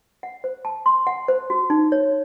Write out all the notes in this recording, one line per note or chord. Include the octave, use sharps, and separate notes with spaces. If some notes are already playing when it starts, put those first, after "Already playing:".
F#5
C5
A5
C6
F#5
C5
F#4
D#4
C#5